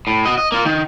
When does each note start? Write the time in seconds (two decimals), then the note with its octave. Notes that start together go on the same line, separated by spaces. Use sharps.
0.07 A2
0.25 F#4 D#5
0.38 D#5
0.52 A#3 F4
0.65 D#3